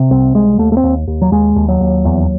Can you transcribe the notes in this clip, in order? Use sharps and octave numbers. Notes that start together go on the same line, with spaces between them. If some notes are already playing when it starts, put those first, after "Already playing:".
Already playing: C3
C2 C4
C2 G#3
D#2 A3
A3
C4
D#2
D#2
F#3
D#2 G#3
D#2
F#3
D#2
E2